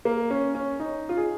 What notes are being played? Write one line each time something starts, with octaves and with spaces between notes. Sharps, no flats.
A#3
C#4
C#4
D#4
F4
G#4